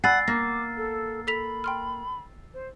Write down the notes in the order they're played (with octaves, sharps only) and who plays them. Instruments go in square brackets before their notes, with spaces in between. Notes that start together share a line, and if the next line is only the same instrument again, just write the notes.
[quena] D5 [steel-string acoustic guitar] F#5 [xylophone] G#5 B5 [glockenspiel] E6 A6 C7
[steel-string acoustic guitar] A#3 [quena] D6 [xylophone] A#6
[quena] A4
[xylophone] A4 B6 F7 [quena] B5
[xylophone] G5 C6 F6
[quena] C5